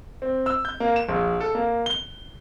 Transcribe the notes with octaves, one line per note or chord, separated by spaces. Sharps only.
C4
E6
G6
A#3
E7
A#1
A4
A#3
G7